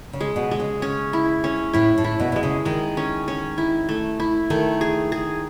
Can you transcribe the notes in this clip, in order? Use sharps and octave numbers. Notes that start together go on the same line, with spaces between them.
C#3
G#3
B2
G#3
C#3
C#4
E4
C#4
A2 E4
A2
E4
B2
B2 G#3
C#3
D#3 G#3
C#4
C#4
E4
A3
E4
D#3 A3
G#4
G#4